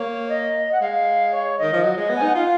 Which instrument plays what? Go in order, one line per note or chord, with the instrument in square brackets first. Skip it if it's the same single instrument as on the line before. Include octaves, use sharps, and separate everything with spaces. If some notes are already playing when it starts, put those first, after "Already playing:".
Already playing: [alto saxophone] A#3 [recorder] C#5
[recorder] D#5
F#5
[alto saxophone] G#3 [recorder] F5
[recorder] C#5
[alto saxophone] D#3 [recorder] D#5
[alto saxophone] F3
[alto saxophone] F#3 [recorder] D#5
[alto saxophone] G#3
B3
[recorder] G#5
[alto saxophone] D#4
[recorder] F#5
[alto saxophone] F4 [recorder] F5